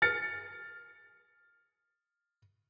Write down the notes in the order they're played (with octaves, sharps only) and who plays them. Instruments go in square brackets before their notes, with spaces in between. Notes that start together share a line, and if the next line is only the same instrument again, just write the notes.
[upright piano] F6 A6 C#7